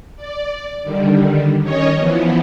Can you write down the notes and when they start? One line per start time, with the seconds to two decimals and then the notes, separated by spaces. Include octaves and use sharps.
0.16 D5
0.83 D3 D#3 G3
1.62 D#3 C#4 C#5 D#5
1.95 E3 F3 B3